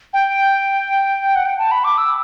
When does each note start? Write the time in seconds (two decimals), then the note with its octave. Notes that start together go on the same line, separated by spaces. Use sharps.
0.13 G5
1.35 F#5
1.46 G5
1.58 A5
1.71 B5
1.84 D6
1.98 E6